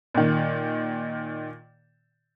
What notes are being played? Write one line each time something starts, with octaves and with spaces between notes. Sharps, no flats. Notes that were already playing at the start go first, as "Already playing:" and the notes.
A#2 D#3